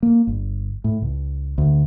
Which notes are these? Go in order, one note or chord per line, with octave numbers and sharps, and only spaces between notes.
A#3
G1
A2
C#2
D2